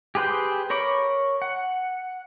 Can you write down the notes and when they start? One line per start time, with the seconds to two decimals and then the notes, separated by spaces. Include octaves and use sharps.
0.15 G4 G#4 B4 C5 G5
0.70 A#4 C#5 B5 D6
1.42 F#5